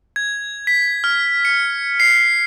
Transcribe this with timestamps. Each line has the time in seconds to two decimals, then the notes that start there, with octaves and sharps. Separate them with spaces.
0.16 G#6
0.67 B6
1.04 F6
1.45 C#7
2.00 C7